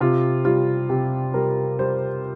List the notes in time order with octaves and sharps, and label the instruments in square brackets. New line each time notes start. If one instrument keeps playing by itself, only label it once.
[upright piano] C3 F4
G3 F4
C3 G4
G3 A#4
G3 C5